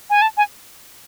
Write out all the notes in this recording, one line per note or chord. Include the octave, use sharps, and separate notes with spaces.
G#5
A5
G#5